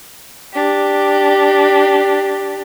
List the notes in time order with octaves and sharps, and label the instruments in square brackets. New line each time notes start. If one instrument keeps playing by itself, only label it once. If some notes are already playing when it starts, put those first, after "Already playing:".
[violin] D4 G4